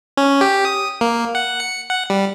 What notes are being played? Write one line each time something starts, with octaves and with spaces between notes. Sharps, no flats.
C#4
G4
D#6
A#3
F#5
C#7
F#5
G3